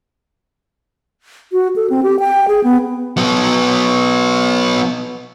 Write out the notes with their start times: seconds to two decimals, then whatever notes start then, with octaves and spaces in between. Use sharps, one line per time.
1.53 F#4
1.76 A4
1.90 C4
2.03 G4
2.20 G5
2.48 G#4
2.64 B3
3.17 F#3 B3